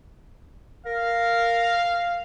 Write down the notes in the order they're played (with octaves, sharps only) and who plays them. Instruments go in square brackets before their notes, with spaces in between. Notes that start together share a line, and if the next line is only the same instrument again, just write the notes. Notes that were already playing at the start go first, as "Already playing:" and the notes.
[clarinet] A#4 [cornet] F5